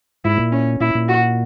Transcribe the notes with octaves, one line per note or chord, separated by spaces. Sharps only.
G#2 E4
A#2
C#4
A#2 E4
A#2
F#4